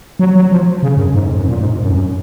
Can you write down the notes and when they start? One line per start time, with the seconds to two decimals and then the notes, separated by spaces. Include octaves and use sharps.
0.19 F#3
0.36 F#3
0.52 F3
0.83 C#3
0.97 F#2
1.14 G#2
1.25 F2
1.36 F#2
1.49 A#2
1.60 G#2
1.83 F#2
1.95 F#2